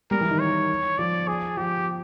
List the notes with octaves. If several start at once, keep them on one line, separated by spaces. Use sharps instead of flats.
G3 A#4
E3
D#3
C#5
F3 D5
G#4
F3 G4